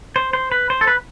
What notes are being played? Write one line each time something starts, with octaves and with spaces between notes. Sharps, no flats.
C5
C5
B4
C5
A4
B4